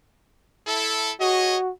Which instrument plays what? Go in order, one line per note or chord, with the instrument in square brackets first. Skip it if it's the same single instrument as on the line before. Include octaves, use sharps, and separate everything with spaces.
[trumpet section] E4 A4
[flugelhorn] F#4 [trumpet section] G#4 C#5 D#5